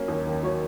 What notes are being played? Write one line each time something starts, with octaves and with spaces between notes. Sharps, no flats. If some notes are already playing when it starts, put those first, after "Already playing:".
Already playing: F#3 A#3 C#4
D#2
D#3
F#3 C#5